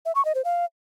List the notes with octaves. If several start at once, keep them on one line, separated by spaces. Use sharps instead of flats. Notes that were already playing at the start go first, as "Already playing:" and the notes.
E5
C#6
D#5
C5
F5